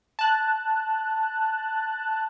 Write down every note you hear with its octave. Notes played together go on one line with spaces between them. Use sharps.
A5 F#6